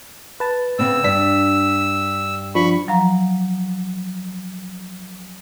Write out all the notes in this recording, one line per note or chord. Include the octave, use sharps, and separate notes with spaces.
B4 A5
C#3 B3 C4 E6
G2 D4 B6
F3 D4 B5 C#6
F3 F#3 F5 A#5